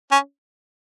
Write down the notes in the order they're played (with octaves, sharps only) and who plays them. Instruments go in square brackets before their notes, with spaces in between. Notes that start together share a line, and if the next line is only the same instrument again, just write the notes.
[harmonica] C#4